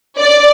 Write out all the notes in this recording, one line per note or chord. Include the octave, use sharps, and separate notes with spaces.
D5